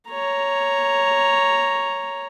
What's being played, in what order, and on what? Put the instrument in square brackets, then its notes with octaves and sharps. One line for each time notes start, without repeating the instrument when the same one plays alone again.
[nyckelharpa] C#5 A#5